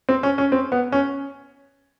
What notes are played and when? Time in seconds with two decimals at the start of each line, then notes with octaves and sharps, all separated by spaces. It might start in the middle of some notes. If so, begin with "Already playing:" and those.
0.09 C4
0.23 C#4
0.38 C#4
0.52 C4
0.72 B3
0.92 C#4